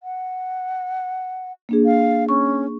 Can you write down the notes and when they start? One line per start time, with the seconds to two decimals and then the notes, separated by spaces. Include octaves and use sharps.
0.03 F#5
1.69 A#3 D4 G#4
1.85 F5
2.29 C#4 C#6